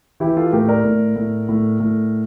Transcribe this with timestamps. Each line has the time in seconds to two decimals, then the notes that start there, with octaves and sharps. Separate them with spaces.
0.20 E3 E4 G4
0.37 F4 A4
0.52 A2 G4 A#4
0.68 A#4 D5
0.84 A2
1.16 A2
1.49 A2
1.80 A2